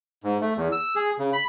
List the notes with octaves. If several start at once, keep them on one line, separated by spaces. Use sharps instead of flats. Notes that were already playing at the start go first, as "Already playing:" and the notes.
G#2
A3
E2
E6
G#4
C#3
B5